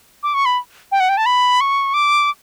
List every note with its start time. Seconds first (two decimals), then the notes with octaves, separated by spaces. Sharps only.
0.23 D6
0.34 C#6
0.46 B5
0.92 G5
1.00 F#5
1.09 G5
1.17 A5
1.26 B5
1.61 C#6
1.94 D6